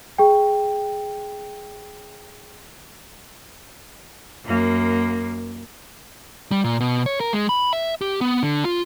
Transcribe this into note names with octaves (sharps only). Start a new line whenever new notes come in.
G#4 G5
F#2 A#3
G3
A#2
B2
C#5
A#4
G#3
B5
E5
G4
B3
D3
F4